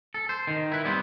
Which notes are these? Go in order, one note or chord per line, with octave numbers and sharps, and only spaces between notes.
A4
C5
D#3
E4 B4
G3 B3 C4